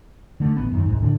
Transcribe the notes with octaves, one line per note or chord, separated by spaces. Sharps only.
D3 A3
A1 B3
F#2 D#3
C2 G#2
A2 D3 D4